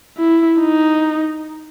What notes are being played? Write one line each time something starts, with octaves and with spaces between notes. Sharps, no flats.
E4
D#4